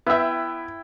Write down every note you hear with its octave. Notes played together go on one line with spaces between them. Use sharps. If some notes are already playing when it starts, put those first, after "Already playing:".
B3 E4 E5 G5